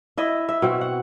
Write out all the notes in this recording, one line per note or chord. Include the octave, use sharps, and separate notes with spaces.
E4 D#5 E5
E5
B2 C4 F#4
F#5